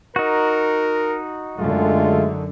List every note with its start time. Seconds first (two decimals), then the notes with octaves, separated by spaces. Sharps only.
0.16 D#4 F#4 A#4
1.58 F#2 D3 G#3 A3 F4